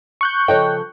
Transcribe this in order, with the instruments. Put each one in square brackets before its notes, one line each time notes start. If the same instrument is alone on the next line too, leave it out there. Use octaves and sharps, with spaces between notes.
[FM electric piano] C#6 F#6 G6
[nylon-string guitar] C#3 F3 A4 [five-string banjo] C#5 D#5 G5